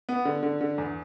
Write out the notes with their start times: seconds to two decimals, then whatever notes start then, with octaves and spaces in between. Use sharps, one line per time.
0.09 B3
0.25 D3
0.43 D3
0.61 D3
0.78 E2